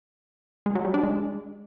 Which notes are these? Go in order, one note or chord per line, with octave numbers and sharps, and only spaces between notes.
G#3
F#3
G3
D4
G#3